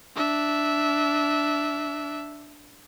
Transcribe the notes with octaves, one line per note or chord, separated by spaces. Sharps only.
D4 E5